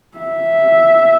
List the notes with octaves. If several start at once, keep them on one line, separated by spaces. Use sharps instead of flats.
E5